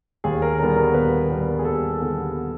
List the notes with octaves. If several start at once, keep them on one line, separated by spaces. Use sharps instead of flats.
D#2 G#4
A#4
D3 G3 B3 A#4
A#4
D#2 B4
D3 G3 B3 A#4
G#4
D#2 A4
D3 G3 B3